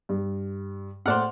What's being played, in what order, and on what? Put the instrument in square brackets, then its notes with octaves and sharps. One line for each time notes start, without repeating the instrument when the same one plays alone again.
[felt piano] G2
[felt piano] A2 A#3 F6 [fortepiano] C5 D5 F#5